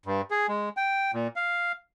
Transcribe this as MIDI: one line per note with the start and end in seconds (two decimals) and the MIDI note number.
0.06 0.21 43
0.31 0.47 68
0.49 0.69 56
0.77 1.11 79
1.14 1.27 46
1.36 1.72 77